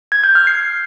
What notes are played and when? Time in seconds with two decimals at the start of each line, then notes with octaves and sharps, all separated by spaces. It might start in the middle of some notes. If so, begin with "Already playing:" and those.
0.12 G#6
0.24 G6
0.35 F6
0.47 C7